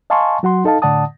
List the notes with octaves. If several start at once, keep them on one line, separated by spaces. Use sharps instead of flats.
D#5 F5 G#5 A5 C6 C#6
F#3 F#4 F#5 C6
D#4 A4 D#5 F5 A5
A2 D3 D5 F#5 A5 D#6